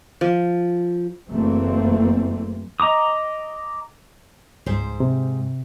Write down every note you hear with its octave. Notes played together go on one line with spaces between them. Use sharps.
F3
F#1 E3 A3 A#3 C4
D#5 A#5 D6 D#6
C#2 G#2 C5
C3